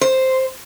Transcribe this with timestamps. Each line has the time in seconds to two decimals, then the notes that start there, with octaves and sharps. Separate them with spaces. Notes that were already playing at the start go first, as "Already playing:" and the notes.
0.01 C5